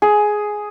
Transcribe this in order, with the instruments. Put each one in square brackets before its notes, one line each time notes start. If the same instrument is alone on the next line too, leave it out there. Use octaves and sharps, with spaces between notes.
[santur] G#4